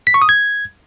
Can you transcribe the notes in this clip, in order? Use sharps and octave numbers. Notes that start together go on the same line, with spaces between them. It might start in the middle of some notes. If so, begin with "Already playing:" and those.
B6
C#6
D#6
G#6